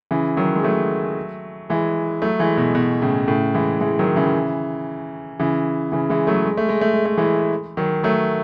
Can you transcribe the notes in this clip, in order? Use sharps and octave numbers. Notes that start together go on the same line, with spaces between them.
C#3 E3
D#3 F#3
G#3
F#3 A3
E3 G#3
F#3 A3
E3 G#3
B2
B2
A2 C#3
A2 C#3
E3 G#3
E3 G#3
D#3 F#3
C#3 E3
C#3 E3
C#3 E3
E3 G#3
F#3 A3
G#3
A3
G#3
A3
G#3
A3
E3 G#3
D#3 F#3
F#3 A3